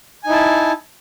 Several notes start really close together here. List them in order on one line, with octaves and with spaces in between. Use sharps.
G#5 D#4 E4 A5